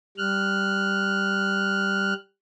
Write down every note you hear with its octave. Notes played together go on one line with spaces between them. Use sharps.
G3 F6 F#6